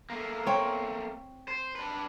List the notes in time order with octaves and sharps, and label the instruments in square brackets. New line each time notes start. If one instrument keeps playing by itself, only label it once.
[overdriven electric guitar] A3 A#3
[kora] C4 C#5
[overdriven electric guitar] C5
D4 B4